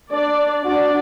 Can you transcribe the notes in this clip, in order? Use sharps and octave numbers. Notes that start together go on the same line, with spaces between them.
D4 D5
D4 F#4 D5